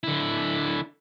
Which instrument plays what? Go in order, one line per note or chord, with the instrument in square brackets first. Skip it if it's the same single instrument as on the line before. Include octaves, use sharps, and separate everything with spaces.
[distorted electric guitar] D3 E4